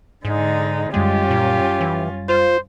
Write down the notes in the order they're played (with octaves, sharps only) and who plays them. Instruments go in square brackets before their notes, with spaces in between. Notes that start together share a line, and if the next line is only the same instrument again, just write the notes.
[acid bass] G#2 [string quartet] D3 G#3 D#4
[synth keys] F#2 G3 A6 [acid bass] G#3 [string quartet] C#4 F4 [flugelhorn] G4
[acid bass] A#2
E3
[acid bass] F4 [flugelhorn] C5